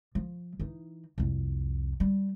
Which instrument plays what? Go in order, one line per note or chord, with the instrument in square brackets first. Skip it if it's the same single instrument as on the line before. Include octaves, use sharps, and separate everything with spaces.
[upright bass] F3
E3 D#4
C2 F2
G3